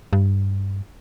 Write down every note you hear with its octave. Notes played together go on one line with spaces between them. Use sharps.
G2